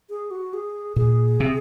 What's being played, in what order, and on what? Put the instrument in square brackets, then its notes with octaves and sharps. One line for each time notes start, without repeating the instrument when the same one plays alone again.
[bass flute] G#4
F#4
G#4
[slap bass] A#2 [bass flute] G#4
[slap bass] C3